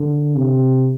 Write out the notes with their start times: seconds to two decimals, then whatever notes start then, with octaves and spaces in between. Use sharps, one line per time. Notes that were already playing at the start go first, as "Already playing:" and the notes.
Already playing: D3
0.36 C3